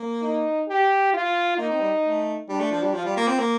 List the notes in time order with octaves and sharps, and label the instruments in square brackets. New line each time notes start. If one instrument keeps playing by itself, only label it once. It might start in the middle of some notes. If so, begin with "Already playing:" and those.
Already playing: [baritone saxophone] A#3
[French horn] D#4
G4
F4
[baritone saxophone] A#3 [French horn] D#4
[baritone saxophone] C4
G3
A3
[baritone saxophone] G3 [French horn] D4
[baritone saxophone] A3
F3
G3
[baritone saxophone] F3 [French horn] F4
[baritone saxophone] G3
A#3
C4
A#3